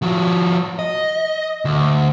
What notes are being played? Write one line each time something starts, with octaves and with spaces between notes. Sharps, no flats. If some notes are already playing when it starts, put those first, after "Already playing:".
F3 F#4
D#5
D2